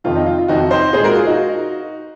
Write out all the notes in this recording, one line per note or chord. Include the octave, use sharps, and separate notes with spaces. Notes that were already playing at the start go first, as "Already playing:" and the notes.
F2 C3 D#3 F4
D#4
F4
F4
F2 C3 D#3 D#4 F#4
C5 D#5
A#2 G#3 G#4 C5
F#4 A#4
F4 G#4
D#4 F#4